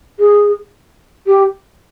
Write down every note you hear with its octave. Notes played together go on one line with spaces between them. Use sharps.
G#4
G4